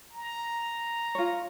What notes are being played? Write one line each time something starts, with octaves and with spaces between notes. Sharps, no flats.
A#5
F4 C#5